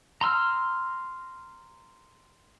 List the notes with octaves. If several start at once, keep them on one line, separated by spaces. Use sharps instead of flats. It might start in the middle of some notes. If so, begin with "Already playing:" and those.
A#5 C6 E6 F6